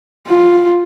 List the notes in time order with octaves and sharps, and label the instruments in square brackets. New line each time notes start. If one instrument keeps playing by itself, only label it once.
[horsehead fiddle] F4